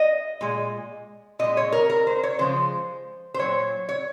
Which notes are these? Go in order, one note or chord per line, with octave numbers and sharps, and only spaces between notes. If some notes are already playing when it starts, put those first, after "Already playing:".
Already playing: D#5
A#2 G#3
A#2 G#3 D#5
C#5
A#4
A#4
C5
C#5
C#3 F3 G#3 C5
C5
A#2 F#3 C#5
C#5